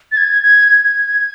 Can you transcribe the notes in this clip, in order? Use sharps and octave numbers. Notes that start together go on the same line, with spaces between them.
A6
G#6
G#6
G#6